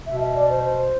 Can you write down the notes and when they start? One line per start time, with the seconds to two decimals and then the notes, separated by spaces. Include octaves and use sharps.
0.07 B2 E5
0.21 E5
0.35 D5
0.50 C5
0.64 C5